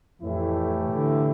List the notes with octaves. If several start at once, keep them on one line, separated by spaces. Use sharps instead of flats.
F2 A2 E3 A3 E4 G4
D3